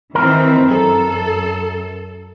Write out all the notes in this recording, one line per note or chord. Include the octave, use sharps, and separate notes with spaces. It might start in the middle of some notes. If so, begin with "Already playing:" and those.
D#3 E3 C4 A#4
F#2 A4